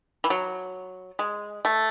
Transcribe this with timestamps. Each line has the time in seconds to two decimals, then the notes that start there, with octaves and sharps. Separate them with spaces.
0.24 E3
0.30 F#3
1.19 G#3
1.65 A3